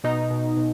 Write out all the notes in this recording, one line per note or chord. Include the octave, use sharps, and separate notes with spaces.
B2 D#4
B2
B2